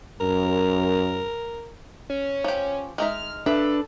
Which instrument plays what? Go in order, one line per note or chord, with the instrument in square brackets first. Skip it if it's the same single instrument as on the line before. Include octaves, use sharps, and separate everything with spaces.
[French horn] F#2 [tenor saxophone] A#4
[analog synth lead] C#4
[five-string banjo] F3 G4
[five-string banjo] G#3 D#4 E5 [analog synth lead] F6
[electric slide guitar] D4 B4 [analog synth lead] A4 [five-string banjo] E5